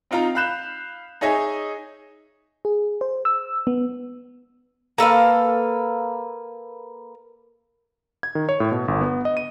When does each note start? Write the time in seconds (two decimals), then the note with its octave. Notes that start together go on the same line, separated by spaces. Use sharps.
0.11 C4 D#4 F4 D#5 A#5
0.35 F5 B5 F#6 G6 E7
1.21 D#4 G#4 C#5 D#5 E5 G#5
2.65 G#4
3.01 C5
3.25 E6
3.67 B3
4.98 A#3 A4 B4 F5
8.23 G#6
8.35 D#3
8.49 C#5
8.60 A2
8.72 B2
8.88 G1
9.01 B3
9.25 D#5
9.37 D#7